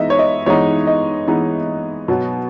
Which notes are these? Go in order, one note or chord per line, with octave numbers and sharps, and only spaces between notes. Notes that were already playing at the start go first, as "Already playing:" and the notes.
Already playing: E3 G#3 B3 D#4 D#5 E5
C#5
D#5
E3 G#3 B3 D#4 C#5
D#5
E3 G#3 B3 D#4
B2 F#3 B3